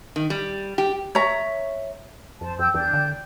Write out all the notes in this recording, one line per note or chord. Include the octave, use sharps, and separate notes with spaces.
D#3
G3
G4
C#5 E5 A#5
F2 C5 A5
F2 G5 E6 G6
E2 D4 G5 G6
D3